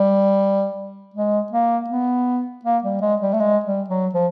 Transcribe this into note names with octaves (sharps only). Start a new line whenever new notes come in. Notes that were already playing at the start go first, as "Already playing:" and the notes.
Already playing: G3
G#3
A#3
B3
A#3
G3
G#3
G3
A3
G#3
G3
F#3
F3